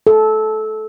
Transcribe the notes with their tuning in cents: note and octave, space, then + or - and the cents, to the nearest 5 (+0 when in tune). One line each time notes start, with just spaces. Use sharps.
A4 -20